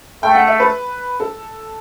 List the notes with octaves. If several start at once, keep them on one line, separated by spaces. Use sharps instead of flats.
A3 G5
F#5
E5
B4
A4